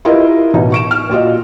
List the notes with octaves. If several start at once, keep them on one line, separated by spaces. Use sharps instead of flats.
E4 F4 G4 A#4 B4 D#5
A1 B2 D#4
C#6 D7 E7
F6
A#2 F4 F#4 D#5